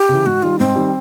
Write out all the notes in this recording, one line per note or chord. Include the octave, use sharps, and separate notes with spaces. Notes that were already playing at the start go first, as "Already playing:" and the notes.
Already playing: G4
C#3 E3
G#2 F#4
D#3 G3 F4
G#2 C4
D#3 G3